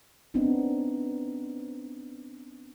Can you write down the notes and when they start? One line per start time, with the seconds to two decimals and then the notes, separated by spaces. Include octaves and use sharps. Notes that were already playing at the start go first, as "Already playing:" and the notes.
0.34 B3 C4 D4 D#4